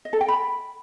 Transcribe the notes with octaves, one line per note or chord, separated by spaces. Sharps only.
D#5
A4
G5
B5